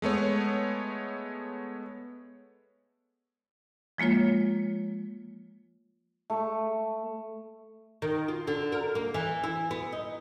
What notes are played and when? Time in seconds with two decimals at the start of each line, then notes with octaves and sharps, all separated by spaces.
0.02 G#3 A3 B3 C#5
3.98 F3 G#3 A#3 F4 C#5
6.30 A3
8.02 D#3
8.28 F4
8.47 D3
8.72 A#4
8.95 A#3
9.14 E3
9.44 E4
9.71 B3
9.92 D#4